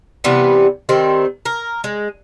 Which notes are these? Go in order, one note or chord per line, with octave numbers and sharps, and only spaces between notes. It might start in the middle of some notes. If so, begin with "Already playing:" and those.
C3 E3 G3 B3
D#3 G3 C4
A#4
G#3